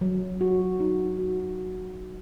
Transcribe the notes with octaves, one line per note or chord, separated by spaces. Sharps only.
F#3
F#4
D#4
F#4